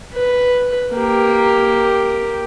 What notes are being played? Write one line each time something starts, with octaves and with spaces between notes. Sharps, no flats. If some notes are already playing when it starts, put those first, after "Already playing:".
B4
A#3 G4